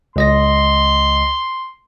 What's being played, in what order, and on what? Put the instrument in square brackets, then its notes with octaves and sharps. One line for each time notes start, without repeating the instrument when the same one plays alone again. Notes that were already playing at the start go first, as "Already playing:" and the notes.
[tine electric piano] C#2 D#5 A#6 [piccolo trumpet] C6